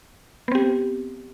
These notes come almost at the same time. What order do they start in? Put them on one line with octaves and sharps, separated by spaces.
B3 C4 G4